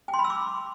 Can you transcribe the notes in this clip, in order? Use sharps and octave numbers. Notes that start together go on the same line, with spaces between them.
G5
C6
B5
E6
D6